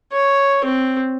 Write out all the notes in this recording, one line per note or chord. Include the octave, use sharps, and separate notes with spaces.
C#5
C4